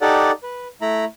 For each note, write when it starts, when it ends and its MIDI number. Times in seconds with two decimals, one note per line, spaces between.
0.01 0.31 63
0.01 0.31 67
0.01 0.31 69
0.01 0.31 74
0.01 0.31 78
0.43 0.68 71
0.81 1.05 57
0.81 1.05 64
0.81 1.05 82
0.81 1.05 83